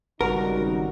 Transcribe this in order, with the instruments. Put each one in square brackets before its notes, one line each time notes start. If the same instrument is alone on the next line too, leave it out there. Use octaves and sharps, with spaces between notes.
[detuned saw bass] G#1 [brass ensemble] C#3 G3 D#4 [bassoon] F#4 [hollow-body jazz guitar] A#4